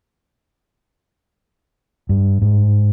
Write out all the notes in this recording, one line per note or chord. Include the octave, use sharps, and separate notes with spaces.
G2
G#2